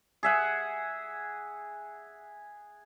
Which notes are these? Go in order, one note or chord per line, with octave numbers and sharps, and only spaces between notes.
G#4 E5 F#5